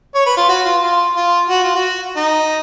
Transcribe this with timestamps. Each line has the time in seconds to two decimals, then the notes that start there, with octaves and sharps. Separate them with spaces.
0.15 C#5
0.26 B4
0.37 F4
0.49 F#4
0.65 F4
0.83 F4
1.16 F4
1.50 F#4
1.63 F4
1.76 F#4
2.16 D#4